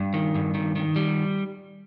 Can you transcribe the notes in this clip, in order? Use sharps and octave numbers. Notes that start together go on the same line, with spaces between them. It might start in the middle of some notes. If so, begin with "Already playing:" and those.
Already playing: G2
D#3
G2
D#3
D#3
G3